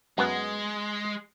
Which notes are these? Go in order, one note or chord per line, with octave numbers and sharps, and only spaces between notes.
F#2 G#3 B3